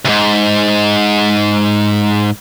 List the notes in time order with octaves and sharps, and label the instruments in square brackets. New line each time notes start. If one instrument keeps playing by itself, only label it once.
[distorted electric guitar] D2 G#2